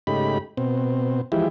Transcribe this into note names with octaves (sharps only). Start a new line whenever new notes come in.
G#2 C#3 A3 D#4 G4 B5
B2 C4
E3 F3 G#3 E4 G4